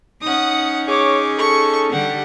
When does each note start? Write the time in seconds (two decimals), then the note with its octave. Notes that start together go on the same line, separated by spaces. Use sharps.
0.22 C#4 D#4 F#5 D#6
0.88 G#4 C#5 D6
1.38 A4 C#6
1.92 D3 G3 G4 F#5